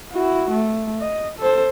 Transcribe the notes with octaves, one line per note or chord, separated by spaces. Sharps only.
E4 F#4
A3
D#5
A4 C5